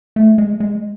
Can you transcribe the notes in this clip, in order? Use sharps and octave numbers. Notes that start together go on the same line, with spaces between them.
A3
G#3
G#3